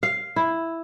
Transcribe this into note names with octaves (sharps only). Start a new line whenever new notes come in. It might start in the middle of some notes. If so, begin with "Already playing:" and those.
F5
E4